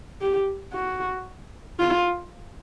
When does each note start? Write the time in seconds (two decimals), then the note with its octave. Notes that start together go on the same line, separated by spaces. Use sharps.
0.21 G4
0.74 F#4
1.80 F4